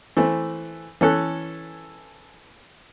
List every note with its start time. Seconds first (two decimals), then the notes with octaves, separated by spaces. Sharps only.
0.17 E3 A3 C4
1.01 E3 C#4 A4 F#6